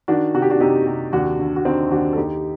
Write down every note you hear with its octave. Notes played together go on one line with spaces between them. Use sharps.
D#3 D4 F#4
C3 F#4
G4
D4 F#4
C3 D#4 G4
C3
D#2 D4 F#4
D3
F#4
D3 C4 D#4
D#2 D4 F#4
A4
D#2 D#4 G4